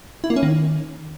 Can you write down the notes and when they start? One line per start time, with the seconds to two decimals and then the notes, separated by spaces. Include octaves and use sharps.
0.24 E4
0.30 A#3
0.36 C#4
0.43 D#3